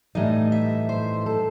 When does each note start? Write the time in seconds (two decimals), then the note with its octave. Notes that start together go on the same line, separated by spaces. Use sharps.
0.15 A2 E3 G3 D#4 D#5
0.52 E5
0.89 C5
1.26 A4